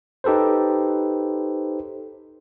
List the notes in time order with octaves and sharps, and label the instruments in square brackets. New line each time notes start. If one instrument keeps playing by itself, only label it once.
[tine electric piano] D#4 G4 A4 B4 C5